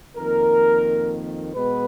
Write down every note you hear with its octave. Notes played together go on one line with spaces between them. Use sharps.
F2 D#3 A#3 A#4
B2 G#3 B3 B4